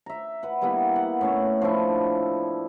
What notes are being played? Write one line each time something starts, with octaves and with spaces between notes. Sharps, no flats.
E5 A#5
B4 F#5
G3 A#3 B3 E4
F#5
A2 C#4 C#5
F3 D4 E4